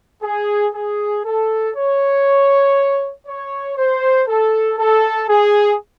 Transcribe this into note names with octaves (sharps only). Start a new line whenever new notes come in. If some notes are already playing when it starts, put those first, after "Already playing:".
G#4
G#4
A4
C#5
C#5
C5
A4
A4
G#4